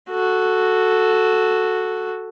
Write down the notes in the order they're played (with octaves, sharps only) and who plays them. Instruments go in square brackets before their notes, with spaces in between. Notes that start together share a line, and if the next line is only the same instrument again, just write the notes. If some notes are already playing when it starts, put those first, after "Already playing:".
[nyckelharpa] F#4 A4